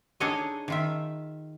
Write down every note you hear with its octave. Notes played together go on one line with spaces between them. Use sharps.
D4 D#4 G#4 A4 C#5 D#5
D#3 F4 E5